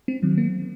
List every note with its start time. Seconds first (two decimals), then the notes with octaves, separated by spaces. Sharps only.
0.08 C4
0.23 D#3 F#3
0.38 A#3